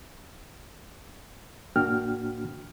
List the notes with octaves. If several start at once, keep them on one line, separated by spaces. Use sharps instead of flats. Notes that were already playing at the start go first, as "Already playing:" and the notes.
A2 A#3 D4 F#4 G5 F6